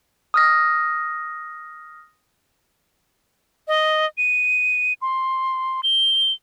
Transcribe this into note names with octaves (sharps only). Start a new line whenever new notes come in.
D#6 F6 A#6
D#5
D#7
C6
G7